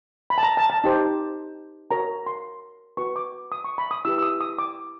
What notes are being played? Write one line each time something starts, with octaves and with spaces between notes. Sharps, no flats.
B5
A5
A#5
A5
A5
D#4 G4 C5
F#4 A#4 C#5 A#5
C6
F#4 B4 C#6
D6
D#6
C#6
B5
D#6
E4 G4 B4 E6
E6
D#6
D#6
D6